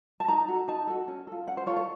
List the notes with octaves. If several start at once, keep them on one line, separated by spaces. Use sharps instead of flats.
A5
D#4 A#5
F#4 A4
D#4 A5
F#4 A4
C#4
F4 A4
C#4 F#5
C5
F4 A4 C#5
C#5